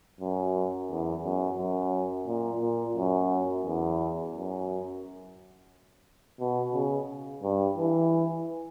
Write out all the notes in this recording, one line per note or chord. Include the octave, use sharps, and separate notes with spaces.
F#2
E2
F#2
F#2
A#2
A#2
F#2
E2
F#2
B2
C#3
G2
E3